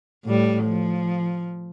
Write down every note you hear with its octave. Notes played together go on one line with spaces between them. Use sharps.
A2 G3
F3